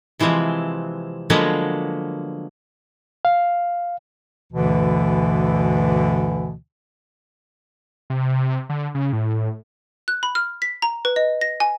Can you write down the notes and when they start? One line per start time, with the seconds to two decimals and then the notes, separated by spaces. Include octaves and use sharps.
0.20 C3 E3 F3 G#3 C4
1.30 D3 F3 F#3 G#3 A#3 B3
3.25 F5
4.53 D2 G2 B2 D3 E3
8.10 C3
8.69 D3
8.95 C#3
9.13 A2
10.08 F#6
10.23 B5
10.35 F6
10.62 B6
10.82 A#5
11.05 B4
11.16 D#5
11.41 A#6
11.60 G#5